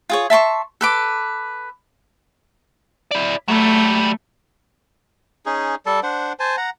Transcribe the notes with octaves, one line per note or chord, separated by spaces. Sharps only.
F4 G#4 C#5
E5 A5 C6 C#6
A4 B4 D6
E4 D5
F#3 G3 A3
C#4 D#4 G#4
G3 A4 A5
D4 C5 F#5
C5 G#5 A5
F#5 A#5